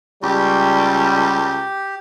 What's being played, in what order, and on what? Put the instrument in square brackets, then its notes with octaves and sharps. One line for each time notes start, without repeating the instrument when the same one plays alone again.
[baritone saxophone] C#2 [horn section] G3 [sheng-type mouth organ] G4